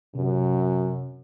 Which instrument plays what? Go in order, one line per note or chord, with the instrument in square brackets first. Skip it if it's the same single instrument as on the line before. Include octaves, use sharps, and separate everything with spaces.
[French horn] F#2 [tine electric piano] C3